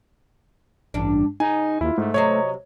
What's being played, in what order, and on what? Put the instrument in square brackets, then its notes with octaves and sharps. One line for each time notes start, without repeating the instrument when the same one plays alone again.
[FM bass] A1 [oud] G2 D4
[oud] C#3 [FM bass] D#4 [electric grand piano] G#5
[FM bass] D#2 [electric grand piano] E4 F4
[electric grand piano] G#2 [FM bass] A3
[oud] C3 F#3 C5 [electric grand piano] C#5 D#5